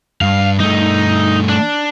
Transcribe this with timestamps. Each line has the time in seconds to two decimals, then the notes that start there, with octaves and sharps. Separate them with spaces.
0.21 G2 F5
0.60 G2 A3 D#4
1.49 D4